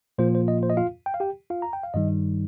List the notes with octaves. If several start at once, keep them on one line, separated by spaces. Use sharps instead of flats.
A#2 F3 A#3 F4 C5
C5
D#5
C5
D#5
F4 F5
G5
F5
G4 G5
F4 F5
A#5
G5
F5
G2 D#3 G3 D#4 D#5